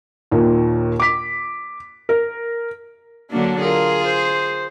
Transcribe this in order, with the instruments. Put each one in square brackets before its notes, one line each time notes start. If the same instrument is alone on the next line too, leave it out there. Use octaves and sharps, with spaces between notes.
[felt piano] D#2 A#2 D#3
D6 B6
A#4
[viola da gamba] D3 F#3 A#3 [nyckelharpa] D4
[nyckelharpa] F4 A#4 [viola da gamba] G#4
[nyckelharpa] C5